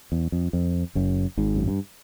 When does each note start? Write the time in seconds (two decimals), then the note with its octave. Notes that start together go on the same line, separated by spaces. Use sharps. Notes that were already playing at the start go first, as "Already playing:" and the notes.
0.12 E2
0.32 F2
0.53 F2
0.95 F#1 F#2
1.37 G#1 G#2
1.55 F#2
1.68 G2